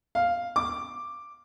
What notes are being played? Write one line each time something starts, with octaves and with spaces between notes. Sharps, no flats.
F5
D6